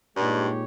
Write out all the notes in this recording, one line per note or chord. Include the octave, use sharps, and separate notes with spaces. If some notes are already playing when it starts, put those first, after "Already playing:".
G2 A#2 G#3 D#4 G4 C#5